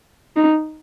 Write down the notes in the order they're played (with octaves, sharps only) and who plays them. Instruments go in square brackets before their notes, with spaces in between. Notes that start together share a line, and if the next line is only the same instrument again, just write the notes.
[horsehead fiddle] D#4